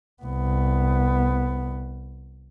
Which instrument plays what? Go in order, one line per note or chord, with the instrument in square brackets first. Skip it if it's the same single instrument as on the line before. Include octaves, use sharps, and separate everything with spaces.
[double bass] C2 B3